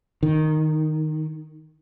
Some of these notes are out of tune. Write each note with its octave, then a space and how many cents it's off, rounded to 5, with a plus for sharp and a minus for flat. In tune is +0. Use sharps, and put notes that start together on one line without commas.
D#3 -5